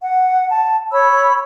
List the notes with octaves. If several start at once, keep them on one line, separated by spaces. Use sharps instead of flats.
F#5
A5
C#5 B5 E6